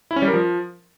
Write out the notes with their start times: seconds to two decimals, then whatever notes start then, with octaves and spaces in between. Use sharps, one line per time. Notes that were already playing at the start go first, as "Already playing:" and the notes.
0.11 E4
0.16 C#4
0.22 G3
0.28 A#4
0.33 F3